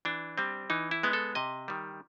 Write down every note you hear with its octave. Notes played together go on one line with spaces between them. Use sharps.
E3 D4
G3 C4
E3 D#4
E4
G#3 B3
A4
C3 D#5
D#3 G3